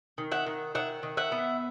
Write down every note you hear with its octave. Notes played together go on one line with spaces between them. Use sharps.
D#3
E5 F#5
D#3
D#3 E5 F#5
D#3
E5 F#5
B3